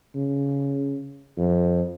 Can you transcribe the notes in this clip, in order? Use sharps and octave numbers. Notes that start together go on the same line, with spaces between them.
C#3
F2